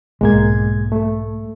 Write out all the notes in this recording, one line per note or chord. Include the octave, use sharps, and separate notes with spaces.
B1 G#2 G#3 A#3 G#6
A3